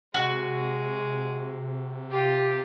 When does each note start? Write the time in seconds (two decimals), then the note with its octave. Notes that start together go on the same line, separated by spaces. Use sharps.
0.14 C3 G#3 F#4
2.11 F4 G4